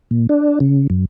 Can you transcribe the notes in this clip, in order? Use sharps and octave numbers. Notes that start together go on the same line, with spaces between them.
A#2
D4
C#3
F#2